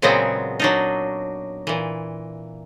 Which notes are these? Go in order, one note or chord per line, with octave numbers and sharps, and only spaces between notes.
A#2 C#3 F#3 G#3 B3 C4
F#3 D4 D#4
A#2 E3